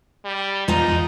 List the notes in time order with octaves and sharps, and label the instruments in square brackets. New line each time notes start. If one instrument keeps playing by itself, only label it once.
[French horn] G3
[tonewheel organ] E2 [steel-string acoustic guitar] G#3 F4 A#5 [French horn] D#4